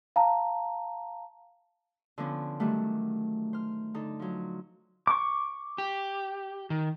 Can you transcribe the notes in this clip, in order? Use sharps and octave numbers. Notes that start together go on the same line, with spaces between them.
F5 A5 A#5
D3 F3 B3 C#4
G2 D#3 F#3 G3 A3 F#5
C5 F6
D3 D#4 A4
F3 F#3
C#6 D6
G4
D#3